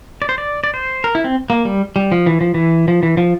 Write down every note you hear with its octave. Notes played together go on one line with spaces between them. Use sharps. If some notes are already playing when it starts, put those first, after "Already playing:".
D5
C5
D5
D5
C5
A#4
E4
C4
A#3
G3
G3
F3
E3
F3
E3
F3
E3
F3